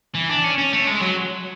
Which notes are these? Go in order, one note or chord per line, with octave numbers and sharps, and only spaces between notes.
E3
D4
C#4
C#4
A3
G#3
F#3